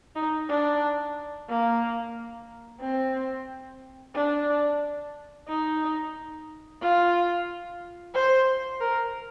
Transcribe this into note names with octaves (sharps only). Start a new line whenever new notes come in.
D#4
D4
A#3
C4
D4
D#4
F4
C5
A#4